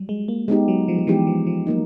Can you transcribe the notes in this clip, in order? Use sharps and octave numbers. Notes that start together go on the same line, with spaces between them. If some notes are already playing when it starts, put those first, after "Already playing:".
Already playing: F#3 G3
G#3
A#3
G#3 B3 D#4 G4
F#3
F3
F3
E3 G#3 B3 D#4 G4
F3
F3
F#3 A#3 D#4